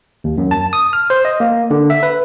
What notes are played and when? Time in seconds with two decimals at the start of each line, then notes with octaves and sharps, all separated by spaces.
0.24 D#2
0.38 F#2
0.51 A5
0.73 D#6
0.93 F6
1.10 C5
1.25 D#5
1.40 A#3
1.70 D3
1.90 E5
2.03 B4